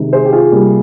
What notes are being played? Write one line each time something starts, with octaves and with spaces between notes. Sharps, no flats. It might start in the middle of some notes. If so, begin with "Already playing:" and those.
Already playing: C3 D#3 G#3
G#4 C5
G4
F4 G#4
C3 G3 A#3